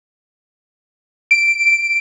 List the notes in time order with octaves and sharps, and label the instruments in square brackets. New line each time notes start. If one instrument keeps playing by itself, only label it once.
[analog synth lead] D7